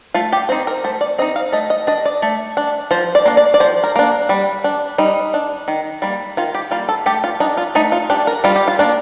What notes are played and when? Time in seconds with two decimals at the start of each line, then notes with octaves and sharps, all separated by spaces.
0.14 A3 F4
0.32 G4
0.49 C4 D#4 C5
0.67 A#4
0.84 A3 C5
1.01 D5
1.18 C4 D#5
1.22 D#4
1.36 F5
1.52 A3 D#5
1.70 D#5
1.87 D4 D#5
2.05 D5
2.22 A3
2.57 D4
2.91 F3 C5
3.15 D5
3.25 A#3 D4
3.37 D5
3.54 D5
3.60 F3 C5
3.84 A#4
3.96 A#3 D4
4.29 G3
4.64 D4
4.98 G3 D#4
5.34 D4
5.68 D#3
6.02 G3 A#3
6.37 D#3 F4
6.55 G4
6.71 G3 A#3 F4
6.89 A4
7.06 A3 G4
7.24 F4
7.40 D4 D#4
7.57 F4
7.75 A3 D#4
7.92 F4
8.10 D4 G4
8.27 A#4
8.44 G3 F4
8.56 G4
8.68 F4
8.79 A#3 D4